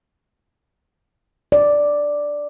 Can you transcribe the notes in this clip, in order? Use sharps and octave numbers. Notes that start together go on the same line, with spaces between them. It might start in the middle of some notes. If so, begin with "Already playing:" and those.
D5